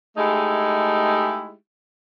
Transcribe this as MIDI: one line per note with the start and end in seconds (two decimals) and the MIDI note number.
0.18 1.54 56
0.18 1.54 57
0.18 1.54 63
0.18 1.54 64
0.18 1.54 67
0.18 1.54 68